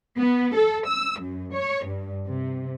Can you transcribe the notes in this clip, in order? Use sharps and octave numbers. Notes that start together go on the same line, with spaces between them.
B3
A4
E6
F#2
C#5
G2
C3